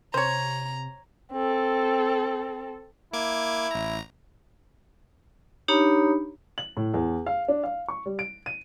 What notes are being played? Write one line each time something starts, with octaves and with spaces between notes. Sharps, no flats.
C3 C5 C#5 A#5
C4 A4
A#3 E4 D6 G#6
A1 A#5
D4 D#4 G4 C#5 A#5 B5
F#7
A2
E2
F5
D4
F5
C#6
G3
D7
D#7